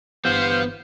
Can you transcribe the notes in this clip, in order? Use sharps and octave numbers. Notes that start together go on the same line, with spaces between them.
G1 G2 E3 B3 G4 C5 F5